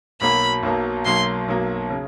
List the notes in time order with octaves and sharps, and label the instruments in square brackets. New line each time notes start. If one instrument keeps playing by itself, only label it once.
[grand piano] B1 B2 F#3 A#3 [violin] B5
[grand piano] B1 B2 F#3 A#3
[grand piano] B1 B2 F#3 A#3 [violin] C6
[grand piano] B1 B2 F#3 A#3
C#3